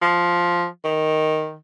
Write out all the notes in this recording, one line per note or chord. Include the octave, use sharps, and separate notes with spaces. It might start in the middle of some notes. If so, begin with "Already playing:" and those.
F3
D#3